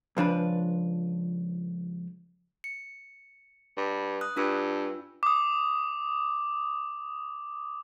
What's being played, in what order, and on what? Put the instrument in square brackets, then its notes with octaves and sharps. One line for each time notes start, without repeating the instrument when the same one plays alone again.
[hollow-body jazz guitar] C#2 F3 D4 B4
[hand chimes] C#7
[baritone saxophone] G2
[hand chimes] D#6 F#6
[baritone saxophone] G2 [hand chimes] D4 F4 E6
[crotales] D6 D#6